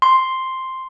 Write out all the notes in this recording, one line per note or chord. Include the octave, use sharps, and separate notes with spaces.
C6